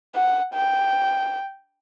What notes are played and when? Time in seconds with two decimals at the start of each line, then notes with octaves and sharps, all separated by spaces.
0.15 F#5
0.54 G5